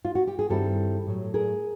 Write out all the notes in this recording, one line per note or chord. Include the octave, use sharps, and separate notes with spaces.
F4
F#4
G4
G#4
G2 D#3 G3 C4 E4 G4 A4
A2 F#3 A3
G#4 A#4